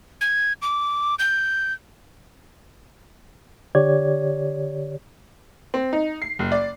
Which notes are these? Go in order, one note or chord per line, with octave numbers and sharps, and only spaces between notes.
G#6
D6
G6
D3 G4 C#5 D5 G#6
C4
D#4
C7
F#1
D5